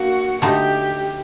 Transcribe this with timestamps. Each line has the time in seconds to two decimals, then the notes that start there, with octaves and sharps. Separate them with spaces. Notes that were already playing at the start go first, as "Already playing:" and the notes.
Already playing: A#3 D4 F#4
0.42 D3 A3 D#4 G4